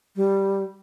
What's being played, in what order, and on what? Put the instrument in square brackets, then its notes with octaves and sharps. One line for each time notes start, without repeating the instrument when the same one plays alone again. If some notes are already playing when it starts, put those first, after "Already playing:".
[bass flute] G3